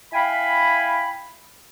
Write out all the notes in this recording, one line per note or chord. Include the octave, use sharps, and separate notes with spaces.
E4 F5 G5 G#5 B5